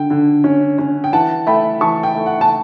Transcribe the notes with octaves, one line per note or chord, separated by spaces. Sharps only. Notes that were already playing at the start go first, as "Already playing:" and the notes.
Already playing: D3 G5
D3
C#4
C#4
G5
E3 F#5 A5
A3 G5 B5
E3 A5 C#6
G5
A3
F#5
A5